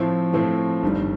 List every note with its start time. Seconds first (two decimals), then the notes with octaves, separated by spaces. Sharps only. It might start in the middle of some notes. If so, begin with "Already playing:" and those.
Already playing: A2 F3 A3 C4 E4
0.33 A2 F3 A3 C4 E4
0.83 G1 G2 D#3 G3